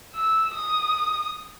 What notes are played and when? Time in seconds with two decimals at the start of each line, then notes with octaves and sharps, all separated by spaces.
0.15 E6
0.54 D#6